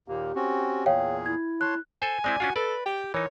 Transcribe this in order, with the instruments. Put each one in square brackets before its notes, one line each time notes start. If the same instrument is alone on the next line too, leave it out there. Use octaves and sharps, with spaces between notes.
[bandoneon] D#2 A#2 A#3 [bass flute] G4
[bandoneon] C4 C#4 F#4
[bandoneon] E2 A#2 G#4 [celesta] C#5 F5 G5
[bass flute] E4 [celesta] G#6
[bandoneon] C#5 A5 C6 [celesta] F#6
[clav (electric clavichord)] A4 C5 [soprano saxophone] G#5
[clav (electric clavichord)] G#3 C4 E4 [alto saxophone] D5
[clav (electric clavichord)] C#4 D4 F4 [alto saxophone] F#4
[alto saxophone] A4 [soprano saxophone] B4 [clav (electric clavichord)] D5
[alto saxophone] G4 [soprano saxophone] G5
[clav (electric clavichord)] E3 D#4 [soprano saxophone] A#4 [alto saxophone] C#5